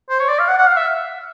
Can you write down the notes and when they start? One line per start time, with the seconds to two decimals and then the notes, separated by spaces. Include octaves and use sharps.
0.10 C5
0.20 C#5
0.29 D5
0.39 F5
0.48 F#5
0.58 F#5
0.67 F5
0.77 E5